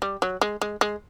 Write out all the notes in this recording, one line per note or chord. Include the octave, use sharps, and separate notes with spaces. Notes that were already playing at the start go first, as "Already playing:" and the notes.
G3
F#3
G#3
G#3
G#3